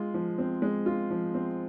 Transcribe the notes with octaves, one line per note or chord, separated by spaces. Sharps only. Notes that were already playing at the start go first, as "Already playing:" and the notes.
Already playing: G#3 F4
F3
C4
G#3
F4
F3
C4